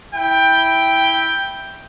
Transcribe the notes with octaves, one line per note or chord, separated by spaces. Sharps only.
E4 G5